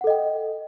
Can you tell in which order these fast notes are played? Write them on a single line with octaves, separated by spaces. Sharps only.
F#5 A4 D#5 G5